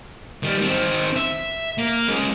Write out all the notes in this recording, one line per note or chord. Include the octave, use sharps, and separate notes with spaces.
D#3 G3
D#3 C4
E5
A#3
G#3 C#4